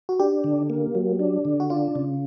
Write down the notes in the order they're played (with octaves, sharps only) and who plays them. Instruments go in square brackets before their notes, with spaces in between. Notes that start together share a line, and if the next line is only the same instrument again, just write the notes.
[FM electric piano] F#4
[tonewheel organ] D4 [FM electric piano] G4
[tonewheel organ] D3
A#3
F#3
D4
D3
[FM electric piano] F#4
[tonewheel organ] D4 [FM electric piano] F4
[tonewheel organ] C#3